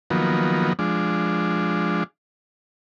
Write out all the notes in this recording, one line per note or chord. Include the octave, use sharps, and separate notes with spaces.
D#3 F3 F#3 A#3 B3
F3 G#3 D4